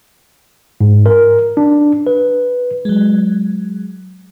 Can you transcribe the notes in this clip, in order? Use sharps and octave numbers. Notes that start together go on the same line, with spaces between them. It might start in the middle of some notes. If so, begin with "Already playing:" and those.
G#2
A#4
D4
B4
F#3 G#3